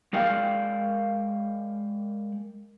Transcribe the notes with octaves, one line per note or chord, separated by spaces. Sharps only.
G#3 A#4 D5 F5 G5